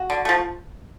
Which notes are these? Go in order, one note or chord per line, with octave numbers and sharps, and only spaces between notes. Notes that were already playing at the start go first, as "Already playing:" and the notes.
Already playing: F#4
D3
F3 A3